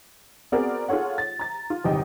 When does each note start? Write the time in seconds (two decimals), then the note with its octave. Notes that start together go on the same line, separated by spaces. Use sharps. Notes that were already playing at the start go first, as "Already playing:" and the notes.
0.52 B3 C4 F#4 G#4 A#4 D5
0.89 F4 G#4 A4 C#5 F#5
1.18 A6
1.39 A#5 A6
1.70 F4
1.84 G1 E2 C3 D#4 G5 D#6